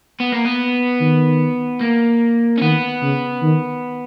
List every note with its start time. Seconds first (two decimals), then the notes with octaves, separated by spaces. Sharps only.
0.20 B3
0.33 A#3
0.45 B3
1.01 D#3
1.81 A#3
2.58 C#4
2.62 D#3 B3
3.02 C#3
3.43 D#3